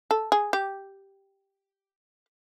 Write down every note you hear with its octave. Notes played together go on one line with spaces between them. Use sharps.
A4
G#4
G4